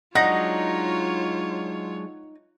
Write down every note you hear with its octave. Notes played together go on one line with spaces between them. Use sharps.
F#3 G#3 D4 D#4 F4 C#5 F#5 A#6